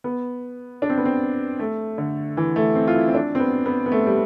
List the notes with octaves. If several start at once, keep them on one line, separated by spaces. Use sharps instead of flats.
B3
D4
C4
B3
C4
A3
D3
E3
A3
C4
F4
E4
C4
D4
C4
B3
B3
B3
A3
G3